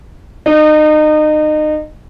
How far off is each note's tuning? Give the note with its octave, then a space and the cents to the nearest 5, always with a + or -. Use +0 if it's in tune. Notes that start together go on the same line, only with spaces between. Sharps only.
D#4 -30